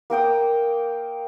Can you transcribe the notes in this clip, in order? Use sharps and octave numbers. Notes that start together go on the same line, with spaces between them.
A#3 A#4 G5 D#6